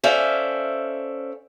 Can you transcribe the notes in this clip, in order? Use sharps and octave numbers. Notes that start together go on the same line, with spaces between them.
C#4 A4 C5 D5 E5 F5